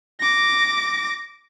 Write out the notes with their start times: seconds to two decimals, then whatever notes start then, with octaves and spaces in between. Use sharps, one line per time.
0.19 D6 A#6